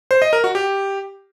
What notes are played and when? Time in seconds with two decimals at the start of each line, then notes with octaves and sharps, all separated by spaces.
0.11 C5
0.22 D#5
0.33 A#4
0.44 F#4
0.55 G4